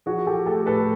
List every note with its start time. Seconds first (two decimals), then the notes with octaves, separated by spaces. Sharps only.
0.06 F3 F#4 G#4
0.26 F3 G4 A4
0.46 A3 G4 A4
0.66 A2 A4 B4